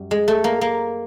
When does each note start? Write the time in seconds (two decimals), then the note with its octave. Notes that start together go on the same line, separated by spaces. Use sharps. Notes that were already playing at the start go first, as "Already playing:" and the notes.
Already playing: F#2 G3
0.11 G#3
0.28 A3
0.44 A#3
0.61 A#3